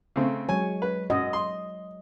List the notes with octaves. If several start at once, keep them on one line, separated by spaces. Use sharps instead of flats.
C#3 A3 C4
F#3 G#3 C#5 G#5
B4
F#2 D#5
C6